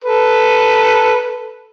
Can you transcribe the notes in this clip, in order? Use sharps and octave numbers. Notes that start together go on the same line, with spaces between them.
A4 B4